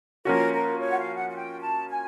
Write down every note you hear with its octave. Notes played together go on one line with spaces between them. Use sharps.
F3 A#3 C#4 F#4 A#4
A#4
C#5
F#5
F5
F#5
F#5
G5
A5
G#5